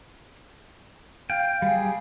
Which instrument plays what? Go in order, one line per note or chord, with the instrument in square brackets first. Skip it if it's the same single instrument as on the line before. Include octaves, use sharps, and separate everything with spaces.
[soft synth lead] F5 [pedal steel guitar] G5
[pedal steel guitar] G3 G#4